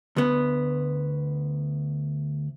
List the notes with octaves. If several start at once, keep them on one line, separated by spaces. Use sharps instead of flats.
D2 B3